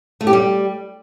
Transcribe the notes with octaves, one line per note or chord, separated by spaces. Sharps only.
A3
G4
G3